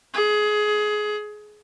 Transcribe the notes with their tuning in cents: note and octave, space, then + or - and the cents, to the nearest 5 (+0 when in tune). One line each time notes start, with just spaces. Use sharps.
G#4 +20